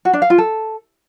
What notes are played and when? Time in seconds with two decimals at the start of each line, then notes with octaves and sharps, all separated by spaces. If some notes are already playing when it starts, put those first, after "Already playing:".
0.05 F#4
0.13 D4
0.22 F5
0.30 F4
0.38 A4